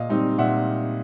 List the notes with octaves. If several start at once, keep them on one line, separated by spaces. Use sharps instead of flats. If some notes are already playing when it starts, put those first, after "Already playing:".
Already playing: A#2 D#5 F5
G3 C4 D#4
A#2 E5 F#5